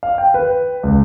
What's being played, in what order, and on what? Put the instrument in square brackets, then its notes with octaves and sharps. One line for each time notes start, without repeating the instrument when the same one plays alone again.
[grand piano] F5
G5
B4
C#2